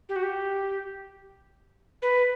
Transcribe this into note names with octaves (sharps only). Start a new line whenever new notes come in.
G4
F#4
G4
B4